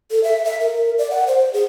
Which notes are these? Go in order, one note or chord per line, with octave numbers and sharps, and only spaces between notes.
A4
E5
E5
A#4
D5
F#5
C5
G#4